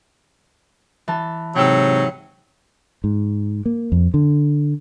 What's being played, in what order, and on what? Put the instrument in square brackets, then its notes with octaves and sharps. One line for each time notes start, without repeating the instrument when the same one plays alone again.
[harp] E3 A5
[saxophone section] G#2 F#3 [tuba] C3 [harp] G5 E6
[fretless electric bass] G#2
A#3
F2
D3